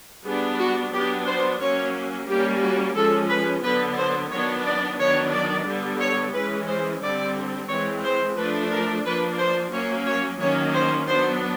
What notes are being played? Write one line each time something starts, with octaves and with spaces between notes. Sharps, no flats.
G3 B3 D4 G#4
F#4
F#3 B3 D4 G4
C5
F#3 A#3 C#4 C#5
G3 A#3 C#4 G4
F#4
F3 G#3 C#4 A4
B4
D3 F#3 B3 B4
C5
D#3 F#3 B3 D4 C#5
D5
D#3 F#3 B3 D4 C#5
D5
D3 G3 B3
C#5
E3 G#3 C#4 B4
C5
D3 G3 C4 D5
E3 G#3 C4 C#5
C5
F3 A3 D4 B4
A#4
F3 A#3 D4 B4
C5
F#3 A#3 C#4 C#5
C#5
D#3 F#3 A#3 C#4 C#5
C5
F#3 B3 D4 C5